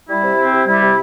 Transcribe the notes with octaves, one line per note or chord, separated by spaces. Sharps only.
G3 E4
C3
C4
C3
G3 E4
C3